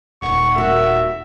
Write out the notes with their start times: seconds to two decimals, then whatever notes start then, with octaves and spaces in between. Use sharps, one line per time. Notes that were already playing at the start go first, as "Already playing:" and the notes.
0.22 D#1 F#5 C#6
0.56 F#4 A#4 E5